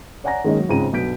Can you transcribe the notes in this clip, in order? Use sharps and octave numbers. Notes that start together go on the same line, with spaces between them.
C#5 D5 F#5 G#5 A#5 A#6
D#3 G#3 A#3 C#4 D#4
F#3
G#2 C#3 C4 F4 A#5 D#7
B1 G2 G6 B6 D7